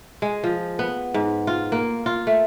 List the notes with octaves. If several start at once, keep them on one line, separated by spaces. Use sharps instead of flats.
G#3
F3
B3
G#2
F4
A#3
F4
A3